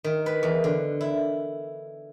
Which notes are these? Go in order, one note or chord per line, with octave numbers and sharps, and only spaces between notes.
D#3
B4
E2
D3
E4